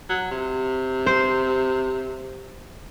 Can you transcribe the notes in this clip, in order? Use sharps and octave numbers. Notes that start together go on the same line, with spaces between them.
F#3
C3
C5